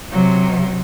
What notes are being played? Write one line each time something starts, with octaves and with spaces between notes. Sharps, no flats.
C3 F#3